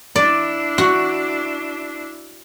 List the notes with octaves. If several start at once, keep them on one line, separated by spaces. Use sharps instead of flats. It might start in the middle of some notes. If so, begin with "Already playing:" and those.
D4 E4 D5
F#4